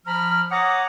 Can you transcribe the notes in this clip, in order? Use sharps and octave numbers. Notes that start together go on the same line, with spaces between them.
F3 A#5 B5 F6
C#5 F#5 A#5 D6 D#6